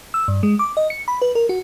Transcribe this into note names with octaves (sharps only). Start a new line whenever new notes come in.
E6
G2
G#3
D6
D#5
C#7
B5
B4
A#4
F#4